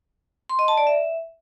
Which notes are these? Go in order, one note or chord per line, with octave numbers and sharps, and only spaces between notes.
C6
D#5
A5
D5
E5